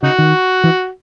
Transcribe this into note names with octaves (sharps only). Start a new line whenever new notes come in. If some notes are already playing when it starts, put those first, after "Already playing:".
C#3 D#4 F#4
D#3
E3